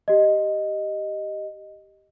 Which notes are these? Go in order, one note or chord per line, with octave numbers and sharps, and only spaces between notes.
G4 D#5